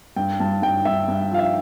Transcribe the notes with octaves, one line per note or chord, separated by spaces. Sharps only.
G2 G5
G2 A5
G2 G5
G2 E5
G2
F3 F5
E5